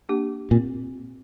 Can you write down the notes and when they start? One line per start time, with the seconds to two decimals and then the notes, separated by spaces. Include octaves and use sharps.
0.09 A#3 D4 G4
0.51 A#2 C4